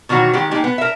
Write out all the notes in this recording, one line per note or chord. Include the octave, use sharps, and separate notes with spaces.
B2 D#3 E3 F#3 F#4
D#3 G#3 G4
G#3 A#3 D#4 G4
B3
A#4 E5